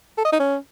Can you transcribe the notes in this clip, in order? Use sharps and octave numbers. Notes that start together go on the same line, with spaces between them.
A4
D#5
D#4
C#4